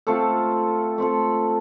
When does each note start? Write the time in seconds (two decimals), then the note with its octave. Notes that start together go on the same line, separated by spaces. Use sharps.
0.07 A3 C4 F4 A4
0.98 A3 C4 F4 A4